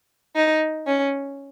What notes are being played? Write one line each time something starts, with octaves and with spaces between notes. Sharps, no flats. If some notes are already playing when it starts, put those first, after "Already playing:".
D#4
C#4